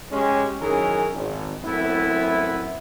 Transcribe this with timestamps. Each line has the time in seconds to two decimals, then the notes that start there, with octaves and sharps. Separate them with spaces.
0.12 G#3 C#4 G4
0.60 F#2 D#3 E3 C#4 G#4 A#4
1.13 G#1
1.64 F#2 A2 B3 C4 E4